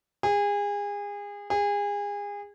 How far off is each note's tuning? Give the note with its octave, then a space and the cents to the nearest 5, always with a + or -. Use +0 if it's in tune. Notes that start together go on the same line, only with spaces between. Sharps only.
G#4 -30
G#4 -30